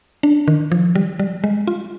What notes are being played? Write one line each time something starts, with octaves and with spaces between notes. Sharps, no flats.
D4
D#3
F3
G3
G3
G#3
F4